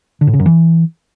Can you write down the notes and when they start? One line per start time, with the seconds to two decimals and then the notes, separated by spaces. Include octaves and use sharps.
0.21 D3
0.27 A2
0.33 C#3
0.40 F#2
0.46 E3